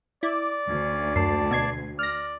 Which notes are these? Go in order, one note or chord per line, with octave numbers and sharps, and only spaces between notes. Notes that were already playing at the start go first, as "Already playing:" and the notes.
E4 D5 D6
D2 C#4
F#2 A5 C7
B2 G#6 C7
D5 F6 A#6